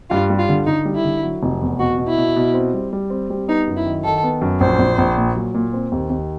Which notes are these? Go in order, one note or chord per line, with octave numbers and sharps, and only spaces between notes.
G2 F4
G3
F4
D3
D3 D#4
G3
E4
D3
F#3
F1
E2
B2 F#4
B2
E4
B2
B2
C4
G3
G3
C4
G3
B3 D#4
F#2
E4
D#3
D#3 A4
B3
F#2
A#1 C5
A#1
A#1
A#2
F#3
A#2
C4
D#2
D#2